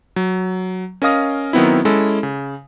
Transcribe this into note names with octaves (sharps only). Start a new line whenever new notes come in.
F#3
C#4 A#4 D#5 F5 D#6 A#6
D#3 F#3 B3 C4 E4
G#3 C#4 E4 A4
C#3